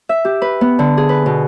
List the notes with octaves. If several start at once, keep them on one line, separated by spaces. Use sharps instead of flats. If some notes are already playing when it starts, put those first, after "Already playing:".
E5
G4
B4
B3
D3
G#4
B4
B2